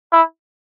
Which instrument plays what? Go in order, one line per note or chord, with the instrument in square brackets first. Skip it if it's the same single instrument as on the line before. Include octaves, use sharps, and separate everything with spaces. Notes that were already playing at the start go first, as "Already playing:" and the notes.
[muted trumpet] E4